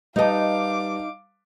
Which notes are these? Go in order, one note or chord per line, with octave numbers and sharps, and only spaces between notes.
G3 D#4 B4 D#5 F5 A5 D6